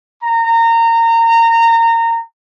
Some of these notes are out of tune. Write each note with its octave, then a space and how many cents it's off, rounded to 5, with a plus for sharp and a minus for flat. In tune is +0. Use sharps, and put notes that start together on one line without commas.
A#5 -25